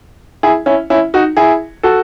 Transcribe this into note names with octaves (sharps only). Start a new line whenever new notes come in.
E4 G#4
C#4 E4
C#4 E4
D#4 F#4
E4 G#4
F#4 A4